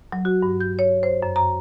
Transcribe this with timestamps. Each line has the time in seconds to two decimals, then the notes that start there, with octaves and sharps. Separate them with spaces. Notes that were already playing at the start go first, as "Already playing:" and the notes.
0.12 F#3
0.25 F#4
0.42 G2
0.60 G6
0.79 C#5
1.03 C5
1.23 F#2
1.36 A#5